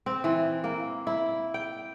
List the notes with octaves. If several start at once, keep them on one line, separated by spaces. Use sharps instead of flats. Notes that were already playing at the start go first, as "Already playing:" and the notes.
C4
E3
A#3
E4
G5